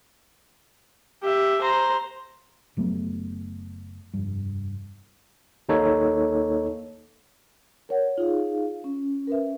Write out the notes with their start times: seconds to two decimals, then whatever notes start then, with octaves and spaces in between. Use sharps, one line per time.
1.23 G4 E5
1.61 C5 A#5
2.77 F#1 F#3 A3 B3
4.14 F1 G2
5.69 D#2 A#3 D#4 A4 C#5
7.89 A#4 C#5 F#5
8.18 D#4 F4 G#4 F5
8.84 C#4
9.27 A#4 B4 E5